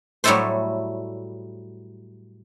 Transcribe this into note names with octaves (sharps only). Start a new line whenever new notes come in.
A2 F#3 G3 E4 A4 C5